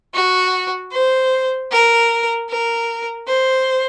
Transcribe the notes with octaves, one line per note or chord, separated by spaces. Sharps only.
F#4
C5
A#4
A#4
C5